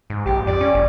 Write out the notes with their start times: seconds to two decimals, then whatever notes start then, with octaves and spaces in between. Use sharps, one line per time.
0.10 G#2
0.26 A#1 G4
0.47 F2 D5
0.61 C#4
0.75 F#1